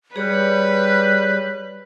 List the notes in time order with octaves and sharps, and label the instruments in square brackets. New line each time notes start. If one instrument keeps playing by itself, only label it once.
[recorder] G3 [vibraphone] G#4 C#5 [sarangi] B4